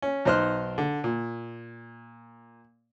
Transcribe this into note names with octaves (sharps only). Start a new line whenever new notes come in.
C#4
B1 D#4 C5 F6 F#6
D3
A#2